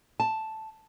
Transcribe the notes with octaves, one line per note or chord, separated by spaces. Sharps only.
A5